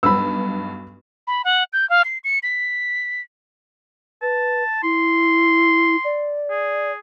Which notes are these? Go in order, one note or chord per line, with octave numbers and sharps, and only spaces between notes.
B1 G2 B3 B5 E6
B5
F#5
G6
F5
C7
C#7
B6
B4 A5
E4 C6
D5
G#4